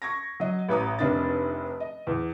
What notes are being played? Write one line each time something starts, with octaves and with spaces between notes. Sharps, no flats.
C#6 G#6 A#6
F#3 D#5
A1 B4 A#5 D#6
F1 C3 D#3 D4 D#4 A6
D#5
E2